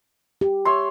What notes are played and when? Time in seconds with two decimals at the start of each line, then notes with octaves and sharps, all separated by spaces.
0.41 G4
0.65 C#5 E5 C6